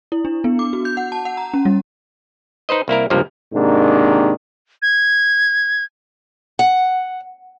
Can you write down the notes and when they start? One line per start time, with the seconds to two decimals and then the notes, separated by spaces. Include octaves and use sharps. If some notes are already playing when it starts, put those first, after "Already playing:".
0.12 E4
0.25 D4
0.44 B3
0.59 D6
0.73 F#4
0.85 G6
0.97 F#5
1.12 A5
1.25 F#5
1.37 A#5
1.54 C#4
1.65 G3
2.69 D#4 B4 C5 D#5
2.88 C2 A#3 E4 A#4
3.10 C#2 G2 C3 F3 A#3
3.53 G#2 C3 D#3 A#3 D4
4.82 G#6
6.59 F#5